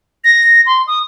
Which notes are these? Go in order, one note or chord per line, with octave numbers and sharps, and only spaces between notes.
A#6
C6
D#6